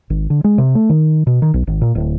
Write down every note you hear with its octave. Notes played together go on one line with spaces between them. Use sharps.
G#1
D3
G#3
C3
A3
D#3
B2
D#3
B1
G#1
A#2
D1